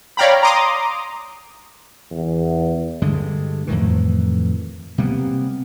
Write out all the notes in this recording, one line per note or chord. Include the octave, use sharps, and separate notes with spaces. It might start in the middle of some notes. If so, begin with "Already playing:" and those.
C#5 D5 F5 G5 A#5 B5
A#5 C6 D6 D#6
E2
G2 D3 G#3
F2 A2 D#3 E3
C3 G3 A#3 B3